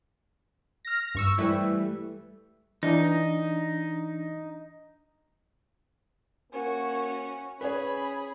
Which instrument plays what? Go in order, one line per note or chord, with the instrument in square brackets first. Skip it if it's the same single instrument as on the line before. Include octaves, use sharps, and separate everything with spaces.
[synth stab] F6 A#6
G2 C#6 E6
[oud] E3 G3 A3 [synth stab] E4 B4
[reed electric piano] E3 D4 [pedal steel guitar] D#4
[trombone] A#3 [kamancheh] C#4 F#4
[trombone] C#4 [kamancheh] G#4 B5 [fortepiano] B4 C#5